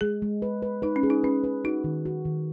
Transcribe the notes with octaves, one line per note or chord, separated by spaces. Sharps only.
G#3 G#4
G#3
B4
B4
D#4 B4
C#4
G#4
D#4
C#4 B4
B4
D#4 F#4
D#3
F#4
D#3